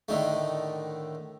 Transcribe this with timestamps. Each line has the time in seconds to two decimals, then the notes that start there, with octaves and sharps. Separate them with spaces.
0.08 A2 D3 D#3 A3